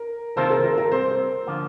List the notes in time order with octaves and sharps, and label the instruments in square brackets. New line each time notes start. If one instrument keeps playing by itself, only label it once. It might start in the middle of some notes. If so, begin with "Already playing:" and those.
Already playing: [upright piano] A#4
[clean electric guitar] C3 D#3 A#3 F4 A4 [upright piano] C5
[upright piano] A#4
A#4
A#4
[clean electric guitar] C3 G3 C4 [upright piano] C5
[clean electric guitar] D3 F3 A#3 F4